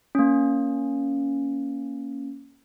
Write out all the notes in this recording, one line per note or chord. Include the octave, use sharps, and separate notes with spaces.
A#3 C#4